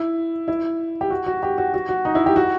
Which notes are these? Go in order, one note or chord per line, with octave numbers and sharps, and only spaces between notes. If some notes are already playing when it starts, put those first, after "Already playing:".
Already playing: E4
E4
G4
F#4
F#4
G4
F#4
F#4
F#4
D#4
E4
G4
F#4